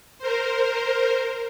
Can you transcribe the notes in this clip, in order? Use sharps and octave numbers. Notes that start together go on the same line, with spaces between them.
A#4 C5